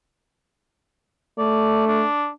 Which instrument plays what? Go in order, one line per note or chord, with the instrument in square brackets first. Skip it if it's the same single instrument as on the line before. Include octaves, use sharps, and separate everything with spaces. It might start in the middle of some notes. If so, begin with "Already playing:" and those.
[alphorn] A3 [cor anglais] D5
[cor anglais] D4